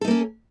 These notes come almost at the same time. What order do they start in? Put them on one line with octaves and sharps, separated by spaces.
A4 D#4 A#3 C#4